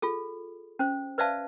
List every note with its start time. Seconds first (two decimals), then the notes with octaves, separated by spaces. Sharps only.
0.02 F4 G#4 A4
0.79 C#4 C5
1.18 B4 C5 D5 E5 F5 A5